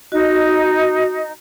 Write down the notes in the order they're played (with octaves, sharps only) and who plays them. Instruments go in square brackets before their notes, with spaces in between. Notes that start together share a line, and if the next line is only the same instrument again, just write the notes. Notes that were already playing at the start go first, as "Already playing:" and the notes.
[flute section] D#4 D#5 [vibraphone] F#4